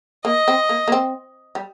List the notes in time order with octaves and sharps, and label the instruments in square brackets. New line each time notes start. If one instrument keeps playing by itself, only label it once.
[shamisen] A#3 [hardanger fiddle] D#5
[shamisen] C4
A#3
A#3
C4
G3